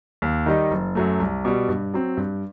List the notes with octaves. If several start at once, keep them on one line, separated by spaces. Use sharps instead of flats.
D#2
D#3 G3 D#4
F#1
F#2 F#3 A3
C2
B2 G3
G2
F#3 C4
G2